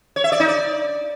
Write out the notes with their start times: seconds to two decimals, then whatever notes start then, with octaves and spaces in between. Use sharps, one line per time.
0.16 C#5
0.24 E5
0.32 D5
0.40 D#4
0.48 D5